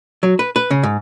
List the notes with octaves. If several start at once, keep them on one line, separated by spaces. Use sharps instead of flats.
F#3
B4
B4
C#3
G#2